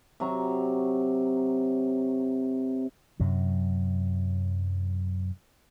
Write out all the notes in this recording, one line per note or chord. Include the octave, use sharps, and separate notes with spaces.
C3 F#3 A#5 C#6
F#2 C3 F#3